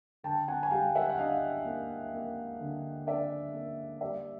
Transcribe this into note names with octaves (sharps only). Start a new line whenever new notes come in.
D3 G5 A5
F#5 G#5
G#5
G3 F5 G5
E5 F#5
F#5
D4 D#5 F5
A#3
A#3
D3
D4 D5 E5
A#3
G3 D5 E5